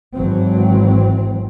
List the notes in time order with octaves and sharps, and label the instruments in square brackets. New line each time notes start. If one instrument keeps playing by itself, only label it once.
[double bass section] G#1 E3 F#3 C4